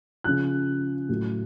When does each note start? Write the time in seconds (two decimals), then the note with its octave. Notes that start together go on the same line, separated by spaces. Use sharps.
0.24 C#3 F3 F#6
1.09 A2 F#3